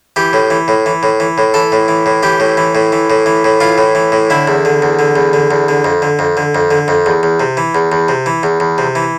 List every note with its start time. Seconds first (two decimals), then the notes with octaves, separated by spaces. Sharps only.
0.16 E3 G4
0.33 A2
0.50 E3
0.68 A2
0.86 E3
1.03 A2
1.20 E3
1.38 A2
1.54 E3 A4
1.72 A2
1.88 E3
2.06 A2
2.23 E3 G4
2.40 A2
2.57 E3
2.75 A2
2.92 E3
3.10 A2
3.26 E3
3.44 A2
3.61 E3 F4
3.78 A2
3.95 E3
4.12 A2
4.30 D3 E4
4.47 E2
4.65 D3
4.82 E2
4.99 D3
5.16 E2
5.33 D3
5.51 E2
5.68 D3
5.84 F2
6.02 D3
6.19 F2
6.37 D3
6.55 F2
6.71 D3
6.88 F2
7.06 E2
7.23 E2
7.40 C3
7.57 E3
7.75 E2
7.92 E2
8.08 C3
8.26 E3
8.43 E2
8.60 E2
8.78 C3
8.95 E3